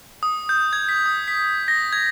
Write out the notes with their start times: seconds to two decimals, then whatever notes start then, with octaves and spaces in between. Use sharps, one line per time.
0.23 D#6
0.49 G6
0.73 G#6
0.89 B6
1.06 D#6
1.28 B6
1.68 A#6
1.93 G#6